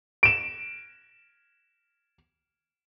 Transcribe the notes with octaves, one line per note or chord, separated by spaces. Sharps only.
D7 E7